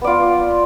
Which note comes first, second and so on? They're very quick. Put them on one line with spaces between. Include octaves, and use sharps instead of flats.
B3 D5 F4